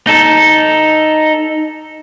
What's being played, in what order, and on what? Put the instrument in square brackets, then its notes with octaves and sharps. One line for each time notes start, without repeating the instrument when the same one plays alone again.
[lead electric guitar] D#4 A4